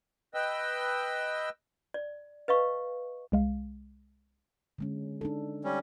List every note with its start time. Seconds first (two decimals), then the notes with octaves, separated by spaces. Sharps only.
0.34 B4 D#5 G5 E6
1.94 D5
2.48 B4 D#5 F5 C#6
3.32 C2 G#3 F5
4.78 D3 G#3 C#4
5.21 D4 D#4 A4
5.64 G3 C#4